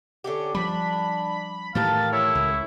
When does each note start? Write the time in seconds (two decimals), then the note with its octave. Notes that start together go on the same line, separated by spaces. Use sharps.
0.24 D3 C#4 G4
0.55 F3 G3 D4 B5
1.75 A2 D#3 E3 G4 A4 A#4 F5 A6
2.13 E4 C#5
2.35 C#2